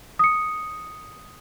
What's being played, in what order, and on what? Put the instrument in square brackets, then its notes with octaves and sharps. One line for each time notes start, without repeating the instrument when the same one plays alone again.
[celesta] D#6 C#7